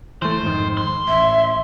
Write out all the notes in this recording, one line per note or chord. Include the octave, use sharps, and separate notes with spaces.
E3 A3 C5
F2 G#2 D#3
C6
A1 E5